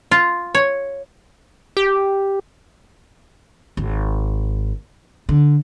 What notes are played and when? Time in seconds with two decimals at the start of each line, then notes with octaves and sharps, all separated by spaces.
0.11 F4
0.55 C#5
1.77 G4
3.77 G#1
5.29 D3